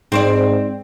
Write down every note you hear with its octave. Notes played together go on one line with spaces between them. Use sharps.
G#2 C4 C5 D5